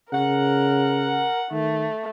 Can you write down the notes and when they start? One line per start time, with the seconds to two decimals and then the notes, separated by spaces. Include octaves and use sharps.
0.13 C#3 A#4 F#5
1.51 D#3 A3